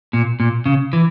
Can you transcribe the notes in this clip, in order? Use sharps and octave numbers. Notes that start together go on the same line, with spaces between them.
A#2
A#2
C#3
E3